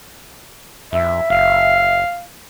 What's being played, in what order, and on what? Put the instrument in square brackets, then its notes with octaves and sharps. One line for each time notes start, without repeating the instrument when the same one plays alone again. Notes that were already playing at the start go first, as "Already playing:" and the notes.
[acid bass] F2 [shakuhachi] E5
[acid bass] F#1 [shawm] F5